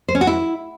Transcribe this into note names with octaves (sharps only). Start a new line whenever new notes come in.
C5
C#4
F#4
E4